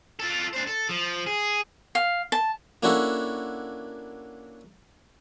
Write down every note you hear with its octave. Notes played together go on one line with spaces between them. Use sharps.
F4 A4
D4 C5
A4
F3
G#4
F5
A5
A#3 C#4 D4 E4 F#4 A4